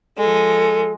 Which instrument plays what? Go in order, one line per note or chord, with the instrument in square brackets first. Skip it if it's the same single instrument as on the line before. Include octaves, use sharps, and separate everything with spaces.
[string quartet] F3 G#3 [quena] A4